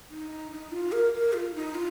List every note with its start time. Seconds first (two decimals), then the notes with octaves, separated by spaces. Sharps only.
0.10 D#4
0.52 D#4
0.72 F4
0.92 A#4
1.14 A#4
1.33 F4
1.55 D#4
1.75 F4